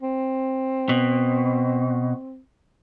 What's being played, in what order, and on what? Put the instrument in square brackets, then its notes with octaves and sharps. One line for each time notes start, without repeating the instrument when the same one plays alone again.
[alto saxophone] C4
[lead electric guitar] B2